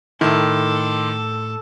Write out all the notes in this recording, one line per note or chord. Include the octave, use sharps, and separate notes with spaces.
A2 D#3 E4 A4 C6 D6